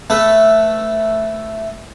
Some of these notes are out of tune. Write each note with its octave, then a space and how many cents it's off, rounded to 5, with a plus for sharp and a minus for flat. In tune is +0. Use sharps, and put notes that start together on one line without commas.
A3 +0 B4 +0